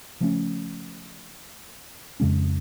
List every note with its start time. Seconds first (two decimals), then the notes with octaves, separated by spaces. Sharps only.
0.20 C#3 F3 A3 C#4
2.20 F2 C#3 G#3 C#4